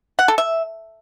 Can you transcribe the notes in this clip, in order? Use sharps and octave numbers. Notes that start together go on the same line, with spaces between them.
F#5
A4
E5